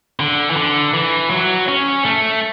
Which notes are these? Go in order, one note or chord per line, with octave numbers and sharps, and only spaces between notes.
D3
E3
D3
E3
F#3
C#4
A3